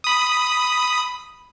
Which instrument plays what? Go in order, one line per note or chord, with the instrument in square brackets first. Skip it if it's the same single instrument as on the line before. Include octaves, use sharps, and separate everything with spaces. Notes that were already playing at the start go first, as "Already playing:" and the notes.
[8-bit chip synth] B5 D#6